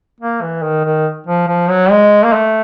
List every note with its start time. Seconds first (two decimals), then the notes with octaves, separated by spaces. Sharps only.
0.21 A#3
0.42 E3
0.63 D#3
0.84 D#3
1.27 F3
1.48 F3
1.69 F#3
1.91 G#3
2.25 A#3
2.33 A3